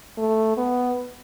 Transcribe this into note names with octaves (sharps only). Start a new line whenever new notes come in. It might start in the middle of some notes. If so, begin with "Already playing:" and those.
A3
B3